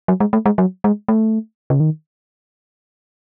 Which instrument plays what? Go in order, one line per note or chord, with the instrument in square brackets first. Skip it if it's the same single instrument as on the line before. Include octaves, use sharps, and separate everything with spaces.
[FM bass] F#3
G#3
A3
G#3
F#3
G#3
A3
C#3
D#3